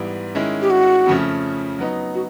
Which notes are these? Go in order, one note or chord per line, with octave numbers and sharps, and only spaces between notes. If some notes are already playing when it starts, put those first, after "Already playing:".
Already playing: G#2 E3 G3 B3 E4
D#3 G#3 C#4 E4
G4
F#4
F2 C#3 F3 A3 C#4
F#3 B3 D#4
F#4